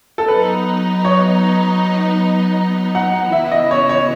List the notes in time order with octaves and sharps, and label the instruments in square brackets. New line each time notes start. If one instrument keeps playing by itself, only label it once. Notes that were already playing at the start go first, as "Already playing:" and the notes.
[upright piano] A4
[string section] F#3 B3 D#4 [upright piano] B4
[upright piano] C#5
F#5
[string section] C#3 E3 B3 E4 [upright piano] E5
[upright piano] D#5
C#5
C#5